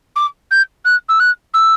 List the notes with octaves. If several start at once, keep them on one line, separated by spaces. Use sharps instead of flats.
D6
G6
F#6
E6
F#6
E6